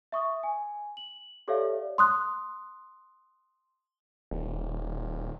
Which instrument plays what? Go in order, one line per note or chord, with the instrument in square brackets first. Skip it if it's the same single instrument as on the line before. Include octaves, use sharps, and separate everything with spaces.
[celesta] E5 C#6 D#6
G#5
F#7
G4 A4 C#5 D5 E5 F5
C6 D#6 F#6
[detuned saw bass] D#1